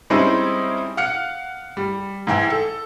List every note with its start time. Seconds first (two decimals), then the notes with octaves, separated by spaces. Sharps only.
0.10 G3 G#3 C4 C#4 D#4 E4
0.97 F5 F#5 F6 C#7
1.77 G3
2.27 G#2 E3 E4 G5 G#5
2.50 A4